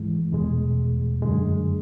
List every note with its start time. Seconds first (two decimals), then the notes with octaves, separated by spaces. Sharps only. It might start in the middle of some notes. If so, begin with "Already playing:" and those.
Already playing: G#2 E3 G#3
0.32 E2 B2 G#3
1.22 F#2 D3 G#3